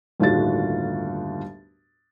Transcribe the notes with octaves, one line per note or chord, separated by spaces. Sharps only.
G1 D#2 A2 F4 F#4 A6